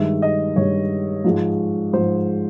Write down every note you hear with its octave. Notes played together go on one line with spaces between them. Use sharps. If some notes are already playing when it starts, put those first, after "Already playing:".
Already playing: G2 D#3 G#3 E5
D#5
G2 D#3 G#3 C#5
G#2 F3 G#3
G#2 F3 G#3 C5